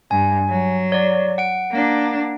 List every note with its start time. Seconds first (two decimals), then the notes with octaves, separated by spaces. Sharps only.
0.11 G2 G#5
0.50 F#3
0.92 C#5 D5
1.38 F#5 D7
1.72 A#3 D4